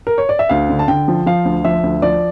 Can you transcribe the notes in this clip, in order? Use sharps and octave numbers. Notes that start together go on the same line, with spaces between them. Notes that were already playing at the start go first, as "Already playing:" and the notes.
A#4
C#5
D5
E5
D2 F5
D3
A5
D3 G5
F3
F3 F5
D2
F3 E5
D2
F3 D5